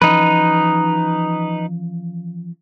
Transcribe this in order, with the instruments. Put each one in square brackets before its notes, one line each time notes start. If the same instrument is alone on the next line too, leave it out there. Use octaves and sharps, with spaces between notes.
[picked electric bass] E3 F3 C#4 [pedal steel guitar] D#4 B4